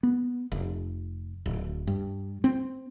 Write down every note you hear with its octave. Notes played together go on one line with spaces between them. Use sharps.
B3
F1
D1
G2
C4